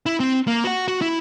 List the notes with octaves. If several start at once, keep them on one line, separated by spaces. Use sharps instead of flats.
E4
C4
A#3
F#4 F#5
F#4
E4